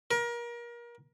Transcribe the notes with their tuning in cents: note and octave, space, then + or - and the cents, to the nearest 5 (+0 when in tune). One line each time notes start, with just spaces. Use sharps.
A#4 +30